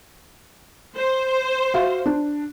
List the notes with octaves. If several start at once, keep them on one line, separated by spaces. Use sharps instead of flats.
C5
F#4 E5 F5
D4